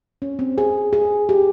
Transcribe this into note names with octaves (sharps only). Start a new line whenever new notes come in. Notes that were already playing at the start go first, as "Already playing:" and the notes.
C#4
C4
G#4
G#4
G4